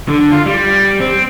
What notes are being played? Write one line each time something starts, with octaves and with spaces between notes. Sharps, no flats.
D3
F4
G3
C4